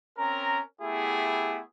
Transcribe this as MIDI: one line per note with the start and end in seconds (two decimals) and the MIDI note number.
0.17 0.60 60
0.17 0.60 61
0.17 0.60 70
0.17 0.60 82
0.81 1.60 57
0.81 1.60 59
0.81 1.60 64
0.81 1.60 67
0.81 1.60 68